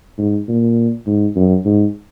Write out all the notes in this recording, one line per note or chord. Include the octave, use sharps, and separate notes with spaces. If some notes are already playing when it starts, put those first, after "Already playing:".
G#2
A#2
G#2
F#2
G#2